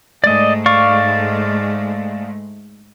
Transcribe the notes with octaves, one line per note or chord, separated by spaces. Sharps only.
G#2 G#3 A3 D5 D#5
D5 F5 C#6